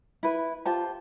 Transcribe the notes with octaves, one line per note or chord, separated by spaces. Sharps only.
E4 B4
F4 G4 C5 A5